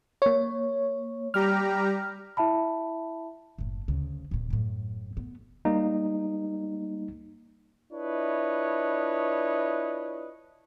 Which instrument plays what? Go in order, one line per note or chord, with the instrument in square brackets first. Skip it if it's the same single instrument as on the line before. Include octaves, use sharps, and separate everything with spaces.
[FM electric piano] A#3 C#5
[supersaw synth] G3 G4 A#5 [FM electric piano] F6
[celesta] E4 E5 A5 B5
[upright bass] F#1 A2
D2 C#3
D1 A#2
F#2 A2
A3 B3
[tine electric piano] G3 A#3 D#4
[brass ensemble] D4 E4 F4 B4 C#5 D#5